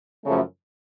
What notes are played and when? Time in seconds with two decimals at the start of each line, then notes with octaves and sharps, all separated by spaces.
0.25 F#2 C#3 F3 A3